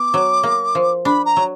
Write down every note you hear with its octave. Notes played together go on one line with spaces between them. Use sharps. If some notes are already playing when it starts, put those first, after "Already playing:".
Already playing: B3 D6
F#3
A#3
F3
D4 B5
A#5
F#3